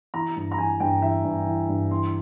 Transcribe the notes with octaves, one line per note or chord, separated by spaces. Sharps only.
E3 A#5
G2
A#5
E3 G#5
G2 G5
E3 E5
G2
E3
G2
E3 C6